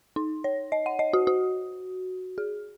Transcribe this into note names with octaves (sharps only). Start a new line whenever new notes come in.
D#4
C#5
D#5
F#5
D#5
F#4
F#4
G#4